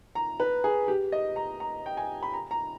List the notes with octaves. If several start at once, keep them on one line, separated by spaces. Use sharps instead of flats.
A#5
B4
G#4
G4
D#5
A#5
A#5
G5
G#5
B5
A#5
A#5